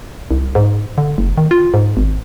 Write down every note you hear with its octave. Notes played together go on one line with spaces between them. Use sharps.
C2
G#2
D3
F#1
D#3
F4
G#2
G#1